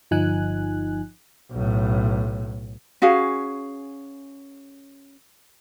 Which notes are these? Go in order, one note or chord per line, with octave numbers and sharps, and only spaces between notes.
G1 F3 D#4 G#5 F#6
B1 A2
C#4 F#4 G#4 F5